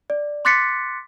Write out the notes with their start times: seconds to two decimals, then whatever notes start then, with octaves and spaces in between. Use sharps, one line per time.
0.10 D5
0.45 C6 D6 F#6 A6 B6 C#7